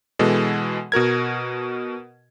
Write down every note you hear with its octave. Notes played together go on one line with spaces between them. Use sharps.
B2 E3 G#3 A4
B2 F#4 A#4 G#6